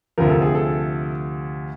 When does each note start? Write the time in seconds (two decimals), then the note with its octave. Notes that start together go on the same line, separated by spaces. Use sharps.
0.18 D2 C3 F3 A#4
0.30 A4
0.42 G#4
0.55 A4